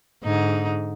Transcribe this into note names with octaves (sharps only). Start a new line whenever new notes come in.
G#2 D3 D#4